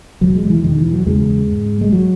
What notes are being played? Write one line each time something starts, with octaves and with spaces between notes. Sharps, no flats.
E2 B2 F#3
G#3
F#3
E3
E2 B2 D#3
E3
F#3
E2 C#3 G#3
G#2
G#3
F#3